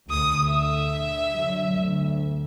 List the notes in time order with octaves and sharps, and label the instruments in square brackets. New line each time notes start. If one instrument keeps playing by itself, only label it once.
[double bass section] D2 [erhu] D#6
[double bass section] D3 [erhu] E5
[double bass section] D3 F#3
D2